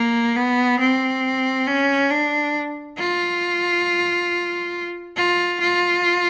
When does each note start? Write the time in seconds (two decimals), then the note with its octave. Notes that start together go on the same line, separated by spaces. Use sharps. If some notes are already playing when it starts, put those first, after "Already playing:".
Already playing: A#3
0.35 B3
0.80 C4
1.67 C#4
2.11 D4
2.98 F4
5.16 F4
5.61 F4